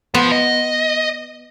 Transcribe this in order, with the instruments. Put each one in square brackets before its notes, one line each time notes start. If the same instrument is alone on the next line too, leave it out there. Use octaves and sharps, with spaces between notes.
[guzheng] B3 [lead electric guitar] F4 C5
[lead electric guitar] D#5